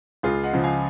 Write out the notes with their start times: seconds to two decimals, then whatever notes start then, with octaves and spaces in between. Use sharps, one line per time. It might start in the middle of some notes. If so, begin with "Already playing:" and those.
0.23 C#2 F4 G#4
0.44 D#5 F#5
0.53 C#3 F3
0.63 F5 G#5